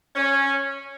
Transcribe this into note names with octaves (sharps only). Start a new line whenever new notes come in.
C#4